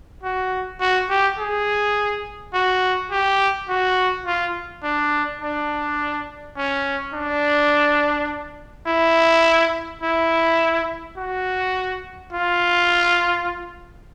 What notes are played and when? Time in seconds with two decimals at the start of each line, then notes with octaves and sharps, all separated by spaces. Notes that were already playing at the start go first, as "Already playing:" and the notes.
0.23 F#4
0.80 F#4
1.09 G4
1.38 G#4
2.54 F#4
3.11 G4
3.69 F#4
4.26 F4
4.83 D4
5.42 D4
6.57 C#4
7.14 D4
8.87 E4
10.02 E4
11.17 F#4
12.32 F4